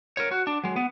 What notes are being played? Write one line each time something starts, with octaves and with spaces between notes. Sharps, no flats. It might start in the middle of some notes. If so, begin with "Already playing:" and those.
A#4 C#5
F#4
D4
F#3 G#3
B3